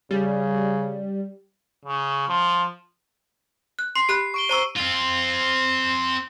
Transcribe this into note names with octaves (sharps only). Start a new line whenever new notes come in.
C#3 G3
C#3
F3
F#6
C6 C7
G4 B5 F#6
C#6 D7 G7
C5 A#5 C#6 E6 D#7
C4 F4